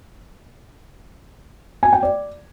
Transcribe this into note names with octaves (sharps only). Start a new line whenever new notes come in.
G#5
G5
D5